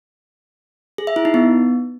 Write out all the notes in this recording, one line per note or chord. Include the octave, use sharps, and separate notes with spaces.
G#4
E5
E4
D#4
B3